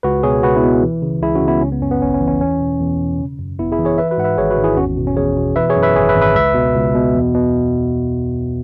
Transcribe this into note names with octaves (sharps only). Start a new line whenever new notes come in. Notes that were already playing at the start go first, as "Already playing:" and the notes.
C#2 F#4 B4
B2 G#4 C#5
C#2 F#4 B4
B3 E4
B2
E3
C#3
C#2 E4 G#4
C#4 F#4
C#2
B3 E4
C#3 C#4
B3
F#2 C#4
B3
G#1 C#4
C#4
E3
C#4
E2 C#4
B2
E2
B2
C#3
F#2
G#1 B3 E4
E4 G#4
E3
G#4 C#5
E3 B4 E5
F#4 B4
G#2 F#5
B4 E5
G#1 G#4 C#5
F#4 B4
G#1
E4 G#4
E2 C#4 F#4
B2
C#4
E2 G#4 C#5
B2
E3 B4 E5
G#4 C#5
F#2
B4 E5
G#1 G#4 C#5
B4 E5
G#1
B4 E5
C#2 B4 E5
B2
C#2
B2
E2
B2